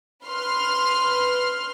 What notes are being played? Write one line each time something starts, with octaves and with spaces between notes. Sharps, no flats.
B4 C6 F6